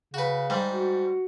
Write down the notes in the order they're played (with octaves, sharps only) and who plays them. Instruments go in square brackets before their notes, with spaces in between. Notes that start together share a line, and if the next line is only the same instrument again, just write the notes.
[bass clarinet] C#3 [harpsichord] F#4 B4
[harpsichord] G#2 G3
[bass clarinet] F#4